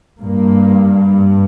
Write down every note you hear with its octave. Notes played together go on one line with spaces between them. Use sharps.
G2 A#3